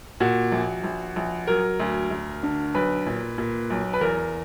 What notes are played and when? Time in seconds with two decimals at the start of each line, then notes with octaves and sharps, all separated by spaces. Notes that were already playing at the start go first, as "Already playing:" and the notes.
0.20 A#2 F#4
0.52 A#1
0.84 A#1
1.16 A#1
1.47 F#3 A#4
1.80 D2
2.11 D2
2.43 D3
2.74 B1 B4
3.06 A#2
3.38 A#2
3.70 B1
3.93 B4
4.01 E2 A#4